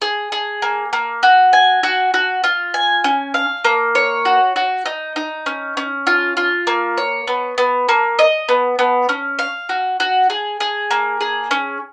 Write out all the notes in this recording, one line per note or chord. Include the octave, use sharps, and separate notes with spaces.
G#4
G#4
A#3
A#3
F#4
G#5
F#4
F#4
F4
G#5
C#4
F5
A#3
C#5
F#4
F#4
D#4
D#4
C#4
C#4
F4
F4
A#3
C#5
B3
B3
A#3
D#5
B3
B3
C#4
F5
F#4
F#4
G#4
G#4
A#3
G#4
C#4